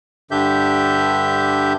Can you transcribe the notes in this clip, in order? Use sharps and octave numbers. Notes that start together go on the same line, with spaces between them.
G2 D3 D4 G4 E5 G6